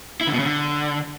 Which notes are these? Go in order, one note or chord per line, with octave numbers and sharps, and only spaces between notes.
E4
D3
B2
C#3
D3